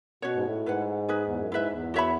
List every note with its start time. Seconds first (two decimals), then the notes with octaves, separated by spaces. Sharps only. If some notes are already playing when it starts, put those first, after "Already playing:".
0.22 B2 C#4 F#4 C#5
0.35 G#2
0.44 A2
0.65 G#2 E4 B4 F#5
1.08 D#4 G#4 B4
1.27 E2
1.39 F#2
1.51 G#2 E4 B4 E5
1.72 E2
1.94 F#4 C#5 E5 B5